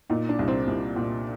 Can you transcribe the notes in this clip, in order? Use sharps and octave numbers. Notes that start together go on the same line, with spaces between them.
A#2 D#4
D4
C2
C4
C2
A#2